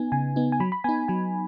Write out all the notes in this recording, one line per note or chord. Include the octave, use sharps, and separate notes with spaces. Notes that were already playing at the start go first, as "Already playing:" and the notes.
Already playing: B3 D#4 G#5
C#3 G#5
B3 D#4
G#5
F#3 B5
B5
B3 D#4 G#5
F#3 G#5